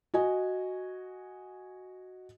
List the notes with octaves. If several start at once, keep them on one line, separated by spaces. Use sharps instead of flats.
F#4 D#5 G#5